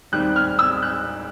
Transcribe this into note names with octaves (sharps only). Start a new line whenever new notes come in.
D#2 D#3 G3 C4 F#6
F6
E6
F#6